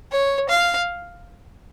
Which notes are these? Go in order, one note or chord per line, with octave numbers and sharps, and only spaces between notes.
C#5
F5